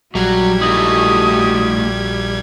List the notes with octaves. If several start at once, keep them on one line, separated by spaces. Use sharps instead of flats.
A#1 F#3 G3 F#4 G4 G#6
A3 D#4 E4 D#6